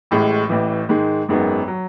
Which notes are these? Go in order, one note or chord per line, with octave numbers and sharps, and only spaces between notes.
A1 A2 G#3
A1 A2 E3
G#2 D#3 G#3
G#1 F#2 D#3 G#3 B3
F#3